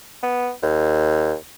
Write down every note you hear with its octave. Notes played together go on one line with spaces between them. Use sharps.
B3
D#2